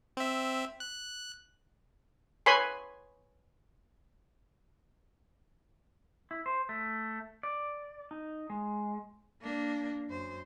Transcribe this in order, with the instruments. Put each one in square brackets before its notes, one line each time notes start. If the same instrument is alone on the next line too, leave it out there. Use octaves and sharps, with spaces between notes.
[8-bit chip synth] C4 E5
F#6
[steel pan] B4 C#5 G#5 B5 C6
[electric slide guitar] E4
C5
A3
D5
D#4
G#3
[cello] A#3 D4
F#2 C5